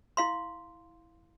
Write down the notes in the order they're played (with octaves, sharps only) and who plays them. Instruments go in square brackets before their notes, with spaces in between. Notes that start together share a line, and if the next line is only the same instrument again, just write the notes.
[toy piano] E4 F5 C6